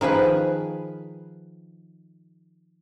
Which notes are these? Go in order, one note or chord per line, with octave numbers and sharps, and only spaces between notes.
D#3 F3 G#4 B4